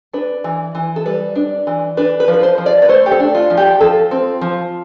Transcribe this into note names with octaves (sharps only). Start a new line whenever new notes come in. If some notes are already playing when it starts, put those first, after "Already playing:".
D4 B4
E3
E3
A4
G3 B4
D4
E3
D4 B4
B4
F3
B4
C5
F3
D5
B4
A3 C5
G4
A4
D4
F4
F3
G4
F3 A4
C4
F3